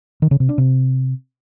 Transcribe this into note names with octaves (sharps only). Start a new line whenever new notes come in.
D#3
C#3
C3
D4
C3